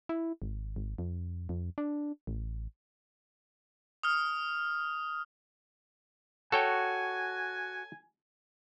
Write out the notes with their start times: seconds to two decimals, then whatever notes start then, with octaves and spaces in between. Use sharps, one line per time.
0.09 E4
0.42 G#1
0.76 G#1
0.98 F2
1.49 F2
1.78 D4
2.27 A1
4.03 D#6 F6
6.52 F#4 A4 C#5 G5 G#5